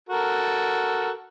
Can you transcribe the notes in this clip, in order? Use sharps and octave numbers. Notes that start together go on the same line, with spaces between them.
F#4 A4 A#4